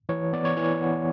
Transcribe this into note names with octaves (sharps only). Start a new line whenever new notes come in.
E3 C#5
B3 D5
C#5
E3 C#5
B3